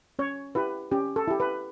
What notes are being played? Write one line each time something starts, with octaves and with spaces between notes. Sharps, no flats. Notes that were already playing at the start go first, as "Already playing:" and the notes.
C#4 C#5
E4 G4 B4
C#4 G4
A4
E4 G4
B4